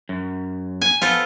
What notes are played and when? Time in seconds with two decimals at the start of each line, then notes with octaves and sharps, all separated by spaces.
0.09 F#2
0.81 G#5
1.02 B3 F4 A4 C5